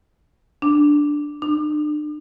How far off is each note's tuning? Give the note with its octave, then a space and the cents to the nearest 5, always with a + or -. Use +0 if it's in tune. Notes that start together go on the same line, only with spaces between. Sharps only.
D4 +0
D4 +40